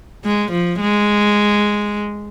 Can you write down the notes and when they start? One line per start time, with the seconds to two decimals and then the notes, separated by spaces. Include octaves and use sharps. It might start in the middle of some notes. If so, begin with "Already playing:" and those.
0.25 G#3
0.52 F3
0.80 G#3